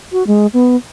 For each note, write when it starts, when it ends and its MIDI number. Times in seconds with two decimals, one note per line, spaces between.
0.12 0.26 66
0.27 0.47 56
0.53 0.76 59